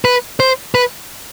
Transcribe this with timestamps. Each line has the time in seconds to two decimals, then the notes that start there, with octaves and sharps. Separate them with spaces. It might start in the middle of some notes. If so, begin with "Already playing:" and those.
0.05 B4
0.40 C5
0.75 B4